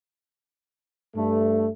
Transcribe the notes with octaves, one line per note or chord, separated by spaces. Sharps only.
G2 A3